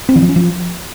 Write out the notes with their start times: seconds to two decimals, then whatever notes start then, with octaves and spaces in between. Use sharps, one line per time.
0.09 C4
0.15 E3
0.22 F3
0.29 C#4
0.36 F3